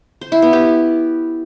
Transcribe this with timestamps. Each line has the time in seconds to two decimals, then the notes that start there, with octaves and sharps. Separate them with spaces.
0.21 C5
0.32 E4
0.42 B3
0.53 G4